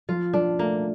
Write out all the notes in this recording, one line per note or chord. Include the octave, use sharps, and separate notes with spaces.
F3 F4
F3 D4
A3 A#3